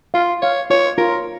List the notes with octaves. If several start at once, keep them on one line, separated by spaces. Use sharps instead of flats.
F4 F5
C#5 F5
F4 C#5
F4 A#4